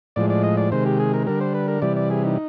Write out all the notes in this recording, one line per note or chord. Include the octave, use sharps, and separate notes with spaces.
A2 F3 G#3 D5
D5
D#5
D5
C3 D#3 G#3 C5
G4
G#4
A#4
D3 G3 A#4
C5
B4
A#4
C3 E3 G3 D5
D5
G#4
D#4